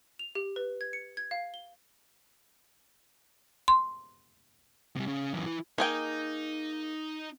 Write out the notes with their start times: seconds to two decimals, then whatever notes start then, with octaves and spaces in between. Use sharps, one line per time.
0.19 F7
0.35 G4
0.56 B4
0.81 G#6
0.93 C#7
1.17 G#6
1.31 F5
1.54 G7
3.68 C6
4.96 C3 G3
5.08 C#3
5.34 F#2 E3
5.46 E3
5.78 A#3 D#4 G#4 G5